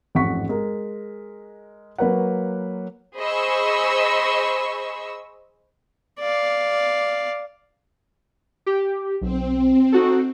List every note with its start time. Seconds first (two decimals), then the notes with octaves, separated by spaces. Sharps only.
0.15 A1 F2 G#2 F#5 C#6 B6
0.49 G#3 A#4
1.98 F#3 A#3 B4 C#5 F#5
3.17 G#4 C5 D#5 B5 C#6 E6
6.19 D5 F5
8.66 G4
9.21 B1 C4
9.92 D#4 F#4 A4